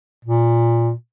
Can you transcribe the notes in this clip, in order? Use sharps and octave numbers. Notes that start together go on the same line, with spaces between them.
A#2